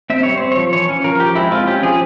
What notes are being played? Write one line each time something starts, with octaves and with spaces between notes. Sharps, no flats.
C4 E5
G3 C#5
C4 C5
C#5
F3
E3 C#5
C#4
F3 A#4
F3 G4
G#3 E4
C4 F4
C#4 G4
F3 G#4